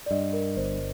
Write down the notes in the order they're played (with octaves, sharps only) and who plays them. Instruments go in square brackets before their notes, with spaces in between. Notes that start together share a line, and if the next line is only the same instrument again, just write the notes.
[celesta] D5
[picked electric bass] G2 [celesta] D#5
[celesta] A#4
[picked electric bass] G1 [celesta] C5